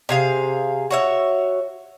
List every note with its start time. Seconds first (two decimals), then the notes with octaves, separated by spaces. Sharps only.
0.09 C3 G#4 F5
0.91 F#4 C#5 E5